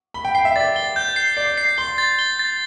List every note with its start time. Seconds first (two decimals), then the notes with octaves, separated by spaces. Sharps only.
0.14 B5 G7
0.25 G5
0.35 G5 C7
0.45 E5
0.56 D5 A6
0.76 G7
0.96 G6
1.16 C7
1.37 D5 C7
1.58 C7
1.78 C6 G7
1.98 A6
2.19 G7
2.39 A6